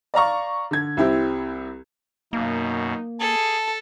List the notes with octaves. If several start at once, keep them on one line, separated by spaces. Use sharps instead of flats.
D5 F5 A#5 C#6
D3 G#6
C2 C4 E4 G4
F#2 B2 A#3 D#4
G#4 A4 A5